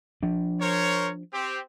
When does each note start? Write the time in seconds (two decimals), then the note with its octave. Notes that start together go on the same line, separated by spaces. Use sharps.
0.23 F3 D4
0.61 A#4 C5 C#5
1.34 C4 G4